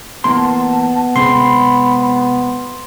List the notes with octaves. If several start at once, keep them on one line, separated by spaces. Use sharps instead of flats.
E3 A#3 B3 A5 C6
C3 G#3 C4 B5 C6